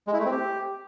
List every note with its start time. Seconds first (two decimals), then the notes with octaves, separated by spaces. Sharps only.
0.07 G#3
0.13 E4
0.19 A3
0.25 C4
0.31 G4